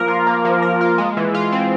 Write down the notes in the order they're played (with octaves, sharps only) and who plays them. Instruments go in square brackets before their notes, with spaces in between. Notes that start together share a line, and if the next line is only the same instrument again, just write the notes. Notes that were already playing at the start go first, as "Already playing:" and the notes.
Already playing: [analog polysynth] F3 A#3 A#4
F4
A#3
F3
A#4
F4
G#3
E3
F4
C4